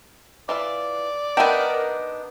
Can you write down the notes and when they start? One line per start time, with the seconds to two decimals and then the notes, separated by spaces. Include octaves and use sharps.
0.49 E3 F4 D5 E5
1.37 B3 D4 D#4 A#4 E5 G5